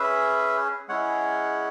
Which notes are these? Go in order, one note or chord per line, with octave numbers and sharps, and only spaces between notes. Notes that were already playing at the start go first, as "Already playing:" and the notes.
Already playing: C#4 G#4 B4 E5
G#3 C#4 E4 G#4 C#5 F#5